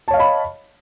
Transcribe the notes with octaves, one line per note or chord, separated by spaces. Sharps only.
C#5 D#5 F5 A5 B5